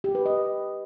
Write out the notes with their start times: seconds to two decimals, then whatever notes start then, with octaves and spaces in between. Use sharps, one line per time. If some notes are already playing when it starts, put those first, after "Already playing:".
0.04 G4
0.15 B4
0.26 D#5